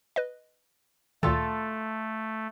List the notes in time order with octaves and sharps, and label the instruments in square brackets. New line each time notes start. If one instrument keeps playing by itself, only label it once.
[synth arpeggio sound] B4 D#5
[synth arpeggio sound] D2 A#2 D#3 [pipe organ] A3 [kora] F4 A4